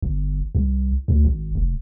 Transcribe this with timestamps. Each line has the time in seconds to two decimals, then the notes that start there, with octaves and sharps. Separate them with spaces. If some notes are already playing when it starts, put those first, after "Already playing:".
0.02 G1
0.55 C2
1.08 D2
1.25 G#1
1.55 F1